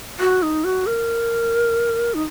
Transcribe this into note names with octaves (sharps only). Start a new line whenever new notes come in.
F#4
D#4
F#4
A#4
D#4